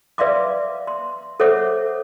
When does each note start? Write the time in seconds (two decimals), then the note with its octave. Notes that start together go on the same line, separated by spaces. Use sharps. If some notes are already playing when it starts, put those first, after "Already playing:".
0.18 B4 D5 E5 F5 C6 D6
0.87 C6
1.40 A4 C5 C#5 E5 F#5 D6